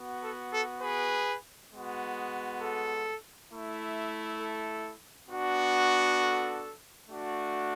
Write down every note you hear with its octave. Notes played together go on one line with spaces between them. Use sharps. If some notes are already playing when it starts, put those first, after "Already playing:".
Already playing: B3 F#4
A4
A4
G#4 B4
G#3 B3 F#4
A4
A3 E4
A4
B3 D4 F#4
A4
A3 D4 F#4